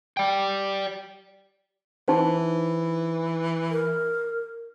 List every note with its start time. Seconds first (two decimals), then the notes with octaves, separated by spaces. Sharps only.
0.17 D5 G5
2.08 E3 D#4 C5
3.70 A#4